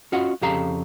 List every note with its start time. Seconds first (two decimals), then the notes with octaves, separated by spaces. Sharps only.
0.12 C#4 F4 F#4 D#5 F#5
0.42 F2 C#3 G4 A4 F5 A#5